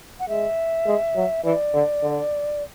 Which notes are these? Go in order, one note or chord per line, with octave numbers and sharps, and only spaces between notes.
F#5
G#3 E5
G#3
F#3
E3 D5
D3
D3